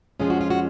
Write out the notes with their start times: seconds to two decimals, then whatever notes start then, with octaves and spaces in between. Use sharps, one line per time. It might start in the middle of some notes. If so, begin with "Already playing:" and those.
0.20 F2 F3 G#3 C#4 F4 G#4
0.30 F#4
0.41 F4
0.50 F#4